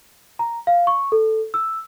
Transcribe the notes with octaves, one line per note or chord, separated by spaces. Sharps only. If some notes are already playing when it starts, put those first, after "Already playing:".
A#5
F5
C#6
A4
E6